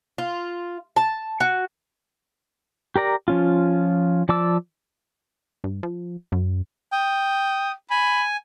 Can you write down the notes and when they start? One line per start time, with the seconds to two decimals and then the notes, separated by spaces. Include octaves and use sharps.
0.18 F4
0.96 A5
1.40 F#4
2.96 G4 A#4 D5 A#5
3.28 F3 C#4 F4
4.29 F3 D5 A5 D6 E6
5.64 G2
5.83 F3
6.32 F#2
6.93 G5 D#6
7.91 G#5 B5